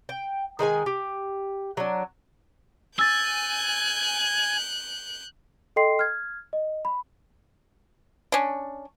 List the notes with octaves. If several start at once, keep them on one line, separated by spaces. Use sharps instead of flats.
G5
D#3 G#3 A4 G#5
G4
F#3 D4
G#5 E6 F#6 G6 A6
A4 D#5 G5 C6 C7
F6 G#6
D#5
B5
C#4 D4